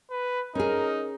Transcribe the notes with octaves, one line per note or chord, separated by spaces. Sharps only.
B4
C#4 D#4 G#4 A#4